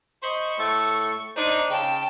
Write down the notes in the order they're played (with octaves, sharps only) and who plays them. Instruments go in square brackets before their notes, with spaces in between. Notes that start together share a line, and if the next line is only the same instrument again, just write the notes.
[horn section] C5 D#5 B5 [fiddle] C#6
[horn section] A2 A3 A4
[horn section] D4 C5 [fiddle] D#4
[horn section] C#3 [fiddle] G5 A5